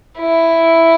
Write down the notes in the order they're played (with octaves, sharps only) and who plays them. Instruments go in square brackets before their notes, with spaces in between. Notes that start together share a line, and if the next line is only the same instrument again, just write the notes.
[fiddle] E4